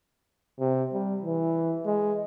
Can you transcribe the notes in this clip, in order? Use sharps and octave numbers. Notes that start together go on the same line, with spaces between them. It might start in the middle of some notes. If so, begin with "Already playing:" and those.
C3
G3
E3
G#3